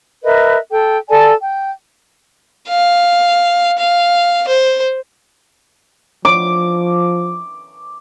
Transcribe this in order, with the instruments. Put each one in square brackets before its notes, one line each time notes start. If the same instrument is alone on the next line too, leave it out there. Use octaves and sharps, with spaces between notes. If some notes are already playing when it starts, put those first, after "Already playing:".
[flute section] A#4 B4 D#5 E5
A4 G5
A4 D5 G#5 A5
G5
[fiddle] F5
F5
C5
[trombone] F3 [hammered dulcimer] D6